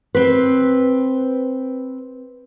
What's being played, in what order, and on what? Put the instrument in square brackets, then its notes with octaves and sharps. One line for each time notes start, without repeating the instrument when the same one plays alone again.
[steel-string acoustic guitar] C4 B4